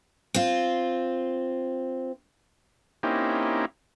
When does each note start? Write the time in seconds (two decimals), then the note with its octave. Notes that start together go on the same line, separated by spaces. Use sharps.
0.34 C4 F4
3.03 A#3 C4 C#4 D#4 E4 G4